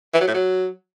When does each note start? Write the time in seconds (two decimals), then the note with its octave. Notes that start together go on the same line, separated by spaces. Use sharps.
0.14 E3
0.21 F#3
0.27 A2
0.34 F#3